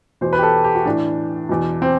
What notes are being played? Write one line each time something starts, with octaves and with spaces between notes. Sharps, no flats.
E2 B2 C5
B4
G4
A4
G4
F#4
A2 E3 D4
E2 B2
C4